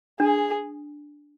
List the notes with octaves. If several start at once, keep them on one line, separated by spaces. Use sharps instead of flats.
D4 G#4